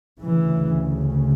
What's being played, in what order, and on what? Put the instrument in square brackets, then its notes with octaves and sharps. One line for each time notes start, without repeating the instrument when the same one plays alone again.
[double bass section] D2 C#3 E3